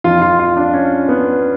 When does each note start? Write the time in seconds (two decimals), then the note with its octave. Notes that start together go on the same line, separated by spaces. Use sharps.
0.04 F2 F3 F4
0.22 F4
0.39 F4
0.57 D4
0.74 C#4
1.09 B3